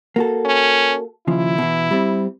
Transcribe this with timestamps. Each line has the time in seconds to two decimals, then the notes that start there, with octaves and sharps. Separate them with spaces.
0.16 A#3 F#4 A4
0.45 C#4
1.27 D#2 C#3 F3 E4
1.58 B2 E3
1.91 G3 C4